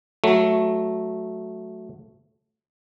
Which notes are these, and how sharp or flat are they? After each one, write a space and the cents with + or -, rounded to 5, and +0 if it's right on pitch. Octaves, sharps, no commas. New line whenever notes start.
F#3 +0 A3 -5